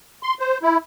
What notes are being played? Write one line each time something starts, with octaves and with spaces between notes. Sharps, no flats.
C6
C5
E4